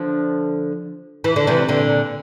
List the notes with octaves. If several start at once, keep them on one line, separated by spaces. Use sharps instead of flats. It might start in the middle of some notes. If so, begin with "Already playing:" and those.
Already playing: D3 F3
E3
D3
C3 E3
A#2 D3